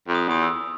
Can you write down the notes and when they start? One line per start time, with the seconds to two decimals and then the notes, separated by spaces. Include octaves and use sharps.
0.08 F2
0.15 D#6
0.28 E2 D#6
0.42 E6